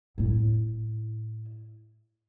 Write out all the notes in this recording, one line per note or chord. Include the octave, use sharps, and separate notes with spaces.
A2 E4